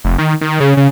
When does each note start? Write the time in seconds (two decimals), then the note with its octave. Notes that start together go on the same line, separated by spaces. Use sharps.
0.04 F1
0.18 D#3
0.41 D#3
0.60 C#3
0.77 C#3